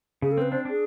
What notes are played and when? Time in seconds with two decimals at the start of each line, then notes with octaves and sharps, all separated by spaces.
0.22 C#3 G#4
0.32 A4
0.38 C4 B4
0.52 D4 C5
0.65 D4 G#4